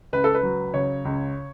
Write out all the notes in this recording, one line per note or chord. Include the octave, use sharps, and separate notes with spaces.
C#2 B4
A4
B4
F#3
C#3 C#5
C#2